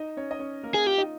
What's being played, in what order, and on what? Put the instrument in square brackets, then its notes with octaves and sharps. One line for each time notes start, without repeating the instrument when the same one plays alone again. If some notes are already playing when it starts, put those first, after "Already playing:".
Already playing: [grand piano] D#4 D#5
C#4 C#5
D#5
C#4 C#5
A#3 A#4
[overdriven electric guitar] G#4
[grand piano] F4 F5 [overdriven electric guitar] G4
[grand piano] D#4 D#5